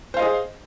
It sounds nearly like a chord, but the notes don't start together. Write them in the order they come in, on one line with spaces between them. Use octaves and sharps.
C5 F5 D#5 G#4